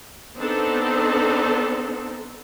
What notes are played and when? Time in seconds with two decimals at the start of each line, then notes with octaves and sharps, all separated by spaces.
0.37 B3 C4 D4 D#4 A4